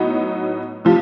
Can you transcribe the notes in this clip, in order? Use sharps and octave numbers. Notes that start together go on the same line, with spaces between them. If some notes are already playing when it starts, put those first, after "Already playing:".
Already playing: A2 F#3 B3 D#4
C3 F3